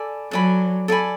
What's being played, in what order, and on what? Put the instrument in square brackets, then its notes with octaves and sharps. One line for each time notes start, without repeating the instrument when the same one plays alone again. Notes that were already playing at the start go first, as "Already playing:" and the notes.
Already playing: [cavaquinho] A4 D5 G#5 B5
[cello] F#3 [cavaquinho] A4 D5 G#5 B5
[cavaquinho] A4 D5 G#5 B5